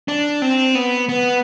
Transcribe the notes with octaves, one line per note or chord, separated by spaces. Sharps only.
D4
C4
B3
B3